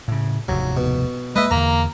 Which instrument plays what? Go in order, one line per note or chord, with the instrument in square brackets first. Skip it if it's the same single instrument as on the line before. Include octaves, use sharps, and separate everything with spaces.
[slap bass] A2 C#3
[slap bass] F1 D#2 G#2 [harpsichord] F#3
[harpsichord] B2
[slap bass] G#3 A#3 [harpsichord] B4 E5 [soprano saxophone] D#5
[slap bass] E2 D3 [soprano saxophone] A#3 [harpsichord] A#5